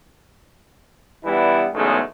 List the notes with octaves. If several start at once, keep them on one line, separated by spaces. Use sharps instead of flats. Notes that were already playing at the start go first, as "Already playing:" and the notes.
E3 G3 B3 D4 E4
B1 E2 C#3 G#3 A3